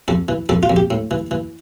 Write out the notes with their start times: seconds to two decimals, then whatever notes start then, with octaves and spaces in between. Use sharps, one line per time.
0.08 F2 A4
0.28 E3
0.49 F2 A4
0.63 F4
0.70 F2
0.76 G4
0.91 A2
1.11 E3
1.31 E3